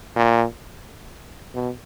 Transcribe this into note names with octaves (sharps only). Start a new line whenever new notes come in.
A#2
B2